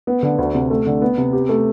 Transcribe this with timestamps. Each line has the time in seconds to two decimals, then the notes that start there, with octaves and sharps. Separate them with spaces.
0.07 B3
0.23 D3
0.38 D2
0.55 C3
0.70 A3
0.86 D3
1.02 B3
1.18 C3
1.33 G4
1.49 A3